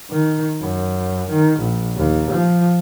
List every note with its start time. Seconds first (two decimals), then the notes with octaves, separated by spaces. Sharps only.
0.11 D#3
0.61 F#2
1.30 D#3
1.60 A#1
1.96 D#2
2.32 F3